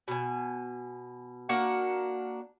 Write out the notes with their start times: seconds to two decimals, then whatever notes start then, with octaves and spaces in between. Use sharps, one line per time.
0.08 B2 G#5
1.49 A#3 D4 F#4 F#5